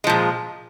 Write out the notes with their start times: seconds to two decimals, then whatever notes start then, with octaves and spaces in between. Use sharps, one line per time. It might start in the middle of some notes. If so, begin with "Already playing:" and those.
0.04 G#3
0.07 F3
0.09 A#2